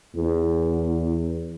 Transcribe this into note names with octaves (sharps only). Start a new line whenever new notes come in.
E2